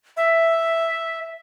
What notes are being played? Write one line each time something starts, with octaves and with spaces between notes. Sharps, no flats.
E5